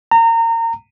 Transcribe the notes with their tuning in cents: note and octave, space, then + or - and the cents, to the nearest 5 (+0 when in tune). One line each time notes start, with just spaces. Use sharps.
A#5 -30